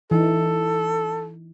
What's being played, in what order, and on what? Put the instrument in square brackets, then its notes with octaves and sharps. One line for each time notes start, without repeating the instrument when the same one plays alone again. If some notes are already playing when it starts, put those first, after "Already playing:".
[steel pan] E3 D#4 [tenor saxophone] A4